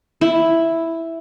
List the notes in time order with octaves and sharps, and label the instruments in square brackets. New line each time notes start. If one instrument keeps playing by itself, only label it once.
[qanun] E4